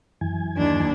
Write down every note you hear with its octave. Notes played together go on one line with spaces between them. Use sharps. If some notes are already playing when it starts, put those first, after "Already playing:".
F#2 E3 G#5
D#2 D4